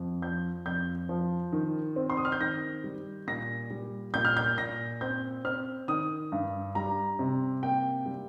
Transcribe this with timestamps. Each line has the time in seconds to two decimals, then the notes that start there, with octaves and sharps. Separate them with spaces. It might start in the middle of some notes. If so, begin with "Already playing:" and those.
Already playing: F2
0.22 F3 G6
0.66 F2 G6
1.09 F3
1.52 D#3
1.96 C4
2.10 C6
2.17 D#6
2.25 F6
2.32 G6
2.40 D#3 A#6
2.84 G3
3.27 A#2 A#6
3.70 G3
4.14 A#2 G6
4.25 F6
4.37 G6
4.58 A#2 A#6
5.01 C4 G6
5.45 C4 F6
5.88 D#3 D#6
6.32 G2
6.75 G3 A#5
7.19 C3
7.63 A#3 G5
8.06 G3